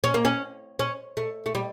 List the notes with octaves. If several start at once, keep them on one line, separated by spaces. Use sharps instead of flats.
C#4
A#3
C#4
C#4
A3
A3
G3